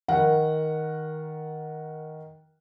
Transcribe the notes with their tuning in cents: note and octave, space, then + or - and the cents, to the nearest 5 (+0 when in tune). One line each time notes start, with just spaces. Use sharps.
D#3 +10 A#4 +0 F#5 +0